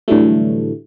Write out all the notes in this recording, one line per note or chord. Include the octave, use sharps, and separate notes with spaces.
A2 D3 E3 F#3 G3 A3